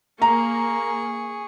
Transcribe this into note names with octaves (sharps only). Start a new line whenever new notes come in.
A#3 G#4 A#5 C#6